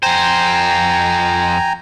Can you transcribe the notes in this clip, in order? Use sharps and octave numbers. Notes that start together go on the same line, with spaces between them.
F2 C5 G5 G#5 A#5